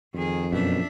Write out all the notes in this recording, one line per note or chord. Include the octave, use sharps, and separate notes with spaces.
F2 D#3 G#4
F#2 B2 D4 E5